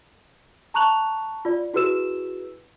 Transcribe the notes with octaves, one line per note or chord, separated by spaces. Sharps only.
A5 A#5 C#6 F#6 F7 F#7
F4 D5
E4 F#4 G#4 B4 E6 E7